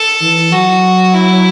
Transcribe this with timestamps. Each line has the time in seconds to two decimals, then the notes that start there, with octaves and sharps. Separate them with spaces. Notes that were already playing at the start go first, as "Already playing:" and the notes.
Already playing: A4
0.21 E3
0.52 F#3 F#4
1.14 E4